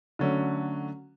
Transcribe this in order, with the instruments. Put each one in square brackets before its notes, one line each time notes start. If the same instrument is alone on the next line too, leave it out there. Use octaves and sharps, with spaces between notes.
[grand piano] D3 F#3 A3 C#4